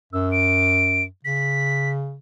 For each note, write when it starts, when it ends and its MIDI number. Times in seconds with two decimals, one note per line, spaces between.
0.13 1.06 42
0.13 0.29 88
0.32 1.03 98
1.25 2.18 49
1.25 1.90 95